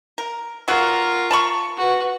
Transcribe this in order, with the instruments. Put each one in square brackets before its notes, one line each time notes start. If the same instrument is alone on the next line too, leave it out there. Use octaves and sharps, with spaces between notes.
[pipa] A#4
[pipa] F#3 F#4 [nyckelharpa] F4 A#4
[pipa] A5 B5 C#6
[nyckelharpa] F#4 B4